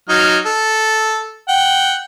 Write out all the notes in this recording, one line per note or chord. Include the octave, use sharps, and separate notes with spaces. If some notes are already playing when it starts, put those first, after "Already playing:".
F#3 D#4 F6
A4
F#5 G5